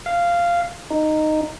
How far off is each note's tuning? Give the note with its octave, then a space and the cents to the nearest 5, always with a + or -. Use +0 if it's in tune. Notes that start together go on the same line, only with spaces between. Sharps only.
F5 -10
D#4 -10